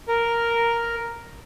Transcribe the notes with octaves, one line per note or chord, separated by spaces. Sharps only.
A#4